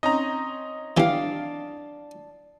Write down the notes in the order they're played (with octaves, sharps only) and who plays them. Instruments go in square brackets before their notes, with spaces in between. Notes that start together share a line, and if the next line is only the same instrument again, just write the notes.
[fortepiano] C4 C#4 D#4 [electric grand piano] D#5 A#5
[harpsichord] E3 G3 [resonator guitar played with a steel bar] D4 F5